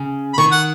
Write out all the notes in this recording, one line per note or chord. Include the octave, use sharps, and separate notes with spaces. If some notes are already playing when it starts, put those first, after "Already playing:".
Already playing: C#3
B5
D#3 C#6
F#5